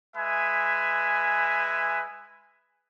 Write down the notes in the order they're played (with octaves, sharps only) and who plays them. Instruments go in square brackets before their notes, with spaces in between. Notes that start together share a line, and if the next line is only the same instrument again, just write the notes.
[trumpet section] G#3 B4 E5 G#5